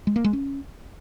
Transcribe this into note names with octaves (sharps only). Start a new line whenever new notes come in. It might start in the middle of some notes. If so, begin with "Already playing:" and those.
G#3
A#3
G#3
C#4